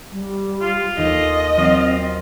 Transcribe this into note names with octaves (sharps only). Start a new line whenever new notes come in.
G3
F4
D#2 A4 D#5
F#3 C4 F4 D#7